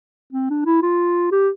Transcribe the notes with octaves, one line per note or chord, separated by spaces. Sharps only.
C4
D4
E4
F4
G4